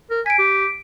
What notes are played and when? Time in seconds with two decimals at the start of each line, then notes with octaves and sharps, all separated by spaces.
0.10 A#4
0.26 G#5 B6 D7
0.39 G4